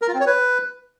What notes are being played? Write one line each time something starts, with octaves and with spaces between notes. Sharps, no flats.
A#4
F4
C4
C#5
B4